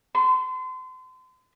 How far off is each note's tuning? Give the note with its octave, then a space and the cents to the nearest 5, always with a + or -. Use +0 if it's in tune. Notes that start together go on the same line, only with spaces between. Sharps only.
C6 -35